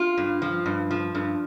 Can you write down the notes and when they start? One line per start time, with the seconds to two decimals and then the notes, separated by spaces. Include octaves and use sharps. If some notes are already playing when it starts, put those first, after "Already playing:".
Already playing: F4
0.17 G2
0.42 F3
0.66 G2
0.91 F3
1.15 G2